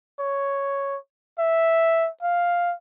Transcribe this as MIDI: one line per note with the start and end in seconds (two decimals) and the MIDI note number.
0.19 0.97 73
1.39 2.09 76
2.23 2.74 77